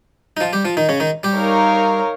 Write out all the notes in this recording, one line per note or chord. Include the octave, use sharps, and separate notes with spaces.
D#4
F3 F4
G3 G4
F3 F4
D#3 D#4
C#3 C#4
D#3 D#4
G3 G4
D#4 A#4 C#5 F5